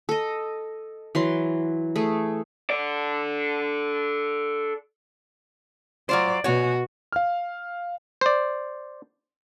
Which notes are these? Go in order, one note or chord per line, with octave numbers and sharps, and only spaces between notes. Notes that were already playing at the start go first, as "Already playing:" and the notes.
A4 D#5
E3 F#3 C6
A3 G#4
A4 D5
F#3 F4 C5 D5
B2 F#4 C#5 G#5
F5 F6
C5 D5